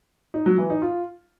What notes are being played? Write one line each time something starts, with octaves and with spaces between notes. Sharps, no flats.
D#4
F#3
E3
D#4
F4